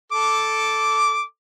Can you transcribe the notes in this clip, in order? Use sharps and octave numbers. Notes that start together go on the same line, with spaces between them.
A4 D6